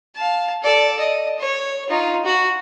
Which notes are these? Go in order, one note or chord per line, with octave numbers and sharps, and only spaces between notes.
F5 A5
A4 D5
D#5
C#5
D#4 F4
F#4